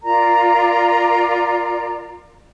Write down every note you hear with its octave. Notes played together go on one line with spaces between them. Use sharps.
F4 A#4 D5 A#5